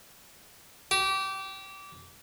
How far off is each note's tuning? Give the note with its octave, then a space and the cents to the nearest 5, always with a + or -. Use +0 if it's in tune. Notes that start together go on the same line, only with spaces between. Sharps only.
G4 -25